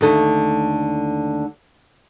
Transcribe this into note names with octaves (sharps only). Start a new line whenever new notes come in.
D#2 D3 A3